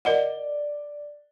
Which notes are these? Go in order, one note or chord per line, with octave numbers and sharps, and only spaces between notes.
A#4 D5 D#5 F#5 G7